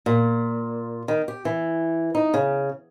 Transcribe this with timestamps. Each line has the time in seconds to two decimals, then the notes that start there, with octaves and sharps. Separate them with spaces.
0.06 A#2
1.08 D#3
1.28 G4
1.45 E3
2.15 D#4
2.34 C#3